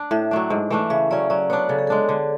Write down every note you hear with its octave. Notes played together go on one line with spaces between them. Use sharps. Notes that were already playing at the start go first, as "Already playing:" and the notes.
Already playing: D4
A2 E5
F#3 A3 D4
G#2
E3 A3 D4
C#3 E5
F#3 C#4 D5
F#3 D5
B3 D4 C#5
C#3 A4
G#4
G#3 D4 A4
D3